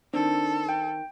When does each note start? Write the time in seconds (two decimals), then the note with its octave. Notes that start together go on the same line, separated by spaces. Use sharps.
0.14 D#3 C4 D4 A4
0.69 G5